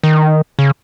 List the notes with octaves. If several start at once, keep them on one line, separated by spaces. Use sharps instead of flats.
D#3
C#3